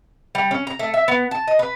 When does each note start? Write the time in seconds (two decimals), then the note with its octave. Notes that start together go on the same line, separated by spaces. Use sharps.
0.35 G3
0.51 C#4
0.67 A#5
0.79 A3
0.94 E5
1.08 B3
1.31 A5
1.48 D#5
1.59 B4